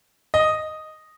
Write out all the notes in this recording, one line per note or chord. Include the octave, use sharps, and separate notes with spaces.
D#5